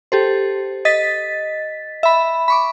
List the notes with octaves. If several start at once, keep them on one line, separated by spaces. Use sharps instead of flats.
G4 A4 C5
D#5 A6 B6
E5 B5
B5 C#6 D6